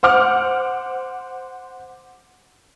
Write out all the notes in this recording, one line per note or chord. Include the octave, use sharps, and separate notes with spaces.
C5 F#5 D6 F6